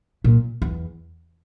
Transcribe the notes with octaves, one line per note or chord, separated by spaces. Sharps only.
A#2
E2